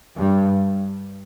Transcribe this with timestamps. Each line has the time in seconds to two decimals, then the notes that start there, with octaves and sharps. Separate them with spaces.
0.15 G2